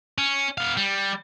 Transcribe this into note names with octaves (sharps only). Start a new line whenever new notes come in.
C#4
B3 F5
G3